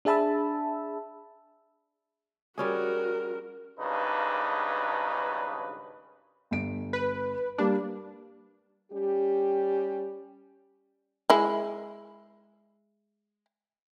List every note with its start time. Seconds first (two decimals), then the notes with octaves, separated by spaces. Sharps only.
0.05 D4 G#4 E5 A5 B5 E6
2.58 G3 C#4 F#4 G#4 A#4
3.79 G#1 G2 C#3 D4 D#4 B4
6.51 G1 D7
6.93 B4
7.58 G3 A#3 D4
8.92 G3 C#4 G4
11.30 G#3 E4